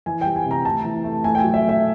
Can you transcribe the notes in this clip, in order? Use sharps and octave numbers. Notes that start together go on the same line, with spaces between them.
E3 G#5
G3 G5
G#5
C3 A#5
D2 A5
E3
A3
A3 G#5
G5
G#5
F#3
E5
A3
E5